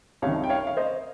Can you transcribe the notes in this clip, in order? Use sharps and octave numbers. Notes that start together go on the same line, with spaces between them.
C2 C3 D#3 C#5 F5
G5
C#5 F5
F5
C5 D#5